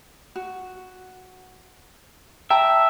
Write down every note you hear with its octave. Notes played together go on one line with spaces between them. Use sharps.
F#4
E5 G5 A5 A#5